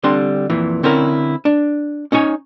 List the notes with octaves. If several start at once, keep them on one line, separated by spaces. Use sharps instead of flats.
D3 G3 C4 D4 C6
F2 A#2 E3
D3 C4 C#4 E4 A#4
D4
C#4 D#4 C#5 G#5